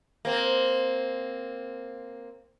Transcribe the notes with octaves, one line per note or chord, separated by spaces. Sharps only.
A#3 C4